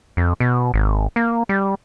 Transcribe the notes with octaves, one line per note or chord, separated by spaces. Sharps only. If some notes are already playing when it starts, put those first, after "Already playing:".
F2
B2
G#1
A#3
G3